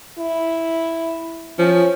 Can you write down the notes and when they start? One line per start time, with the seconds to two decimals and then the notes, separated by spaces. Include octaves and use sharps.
0.18 E4
1.59 F3 C#4